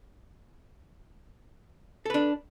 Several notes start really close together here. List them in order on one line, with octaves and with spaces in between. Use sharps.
A4 B4 D4